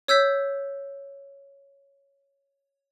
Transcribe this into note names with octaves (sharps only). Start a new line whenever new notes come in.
C#5 E6 G6 B6